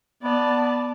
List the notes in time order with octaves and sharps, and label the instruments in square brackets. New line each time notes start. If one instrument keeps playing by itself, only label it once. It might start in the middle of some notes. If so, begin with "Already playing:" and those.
[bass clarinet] B3 [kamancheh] D5 A5